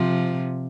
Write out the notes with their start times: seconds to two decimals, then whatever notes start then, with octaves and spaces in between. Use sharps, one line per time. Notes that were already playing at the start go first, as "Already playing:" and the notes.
Already playing: C3 F3